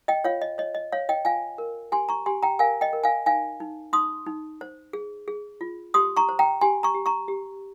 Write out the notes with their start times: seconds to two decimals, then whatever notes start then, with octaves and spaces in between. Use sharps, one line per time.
0.08 D#5 G5
0.24 F4 C#5 F5
0.41 D#5
0.58 C#5 D#5
0.75 D#5
0.92 C#5 F5
1.09 D#5 G5
1.25 F4 F5 G#5
1.58 A#4
1.92 G4 G#5 C6
2.09 A#5 C#6
2.26 G4 G#5 C6
2.43 G5 A#5
2.59 A#4 F5 G#5
2.81 D#5 G5
2.93 A#4
3.04 F5 G#5
3.26 D#4 F5 G#5
3.60 D#4
3.93 D#4 C6 D#6
4.26 D#4
4.61 C5
4.93 G#4
5.28 G#4
5.61 F4
5.94 G4 C6 D#6
6.16 A#5 C#6
6.29 C5
6.39 G5 A#5
6.61 G4 G#5 C6
6.83 A#5 C#6
6.94 G4
7.06 A#5 C#6
7.28 G4